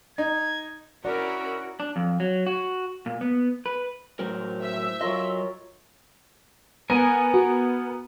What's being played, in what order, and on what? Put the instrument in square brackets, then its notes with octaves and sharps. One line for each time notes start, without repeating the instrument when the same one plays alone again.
[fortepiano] D#4 [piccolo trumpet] G#6
[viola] C#4 E4 [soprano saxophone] F#4 [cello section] A#4 [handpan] D5
[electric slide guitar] D4
F2
F#3
F#4
A#2
B3
B4
[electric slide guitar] A2 F#3 A#4 [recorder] C5
[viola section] E5
[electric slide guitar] F#3 D#5 [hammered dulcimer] F4 A#4 C#5
[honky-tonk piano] B3 [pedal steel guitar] A#4 G#5
[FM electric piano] F#4